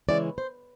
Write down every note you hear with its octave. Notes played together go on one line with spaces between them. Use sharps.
C#3 E3 G#3 C#4 E4 D5
C5